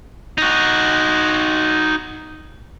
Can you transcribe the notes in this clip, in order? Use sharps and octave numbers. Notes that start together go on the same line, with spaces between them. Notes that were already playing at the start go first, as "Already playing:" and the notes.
D#4 F#4